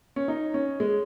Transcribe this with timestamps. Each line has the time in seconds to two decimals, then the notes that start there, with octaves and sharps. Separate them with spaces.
0.16 C#4
0.28 D#4
0.54 C#4
0.80 G#3